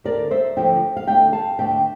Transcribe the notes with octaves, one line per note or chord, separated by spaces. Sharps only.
D2 D3 F3 A3 A#4 D5
C5 E5
D2 D3 F3 A3 E5 G5
F5
D2 D3 A3 E5 G5
F5 A5
D2 D3 A3 E5 G5